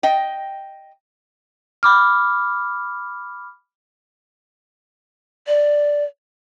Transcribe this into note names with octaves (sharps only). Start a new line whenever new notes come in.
D#5 G5
B5 D6 F6
D5